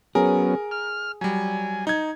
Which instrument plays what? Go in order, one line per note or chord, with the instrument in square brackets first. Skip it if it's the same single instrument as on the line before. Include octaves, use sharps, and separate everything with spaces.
[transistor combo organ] F#3 B3 C#4 [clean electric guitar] G#4 [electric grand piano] A#4
[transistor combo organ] F6
[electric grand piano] F#3 G3 [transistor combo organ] G#5
[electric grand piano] D#4 G#6